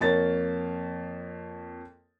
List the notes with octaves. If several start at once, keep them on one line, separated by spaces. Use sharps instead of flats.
F2 A#3 C#5 A6